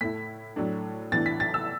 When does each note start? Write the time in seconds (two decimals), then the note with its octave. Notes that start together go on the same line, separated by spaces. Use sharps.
0.01 A2 A3 E4 B6
0.56 A2 F#3 A3 D4
1.12 A2 E3 B3 D4 A6
1.26 B6
1.40 A6
1.54 E6